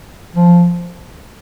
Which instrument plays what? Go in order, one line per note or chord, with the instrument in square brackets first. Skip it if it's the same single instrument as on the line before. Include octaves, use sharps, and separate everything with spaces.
[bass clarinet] F3